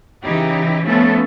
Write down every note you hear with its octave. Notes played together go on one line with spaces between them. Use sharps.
C#3 E3 D#4 E4 G4
F3 A3 B3 C#4 A4